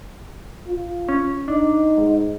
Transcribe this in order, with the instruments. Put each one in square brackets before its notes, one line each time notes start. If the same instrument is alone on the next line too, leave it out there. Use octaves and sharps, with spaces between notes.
[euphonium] F4
[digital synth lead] C#4
[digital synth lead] D4 [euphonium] D#4
[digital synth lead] G#2